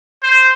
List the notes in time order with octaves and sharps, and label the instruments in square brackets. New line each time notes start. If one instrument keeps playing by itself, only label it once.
[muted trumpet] C5